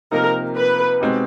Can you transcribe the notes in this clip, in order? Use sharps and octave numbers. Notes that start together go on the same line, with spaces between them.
C3 F3 A#3 D#4 A#4
B4
B2 G#3 C4 D#4 G4